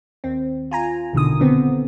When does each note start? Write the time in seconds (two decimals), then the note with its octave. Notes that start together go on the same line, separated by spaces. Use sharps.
0.24 D#2 C4
0.71 F4 G#5 A#5
1.13 A#1 B2 D3 D#3 D#6
1.40 D3 B3 C4